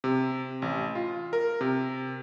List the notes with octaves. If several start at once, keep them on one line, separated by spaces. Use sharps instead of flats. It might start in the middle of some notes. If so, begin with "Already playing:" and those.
C3
A1
F4
A#4
C3